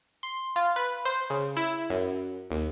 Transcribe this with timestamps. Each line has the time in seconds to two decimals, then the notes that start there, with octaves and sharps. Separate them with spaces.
0.23 C6
0.56 F4
0.76 B4
1.05 C5
1.30 C#3
1.57 E4
1.90 F#2
2.51 D#2